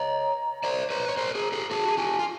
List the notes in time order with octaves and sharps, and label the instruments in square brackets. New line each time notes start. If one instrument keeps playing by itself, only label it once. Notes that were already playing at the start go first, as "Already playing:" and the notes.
Already playing: [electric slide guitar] C#5 D#5 [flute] A#5
[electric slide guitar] C5 D5 [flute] A#5
[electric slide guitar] B4 C#5
C#5
A#4 C5
G#4 A#4
G4 A4
[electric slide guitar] F#4 G#4 [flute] A5
[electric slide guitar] G#4
[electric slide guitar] F4 G4 [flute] G#5
[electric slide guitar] F4